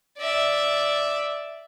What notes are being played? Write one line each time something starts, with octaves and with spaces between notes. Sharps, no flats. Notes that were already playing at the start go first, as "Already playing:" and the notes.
D5 E5